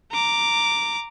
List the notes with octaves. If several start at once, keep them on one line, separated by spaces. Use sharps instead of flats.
A#5 D6